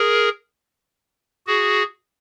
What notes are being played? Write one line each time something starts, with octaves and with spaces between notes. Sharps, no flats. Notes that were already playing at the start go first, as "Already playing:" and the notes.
Already playing: G#4 A#4
F#4 G#4